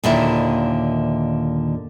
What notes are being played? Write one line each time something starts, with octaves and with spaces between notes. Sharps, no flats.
D#2 A#2 D3 D#3 E4 E5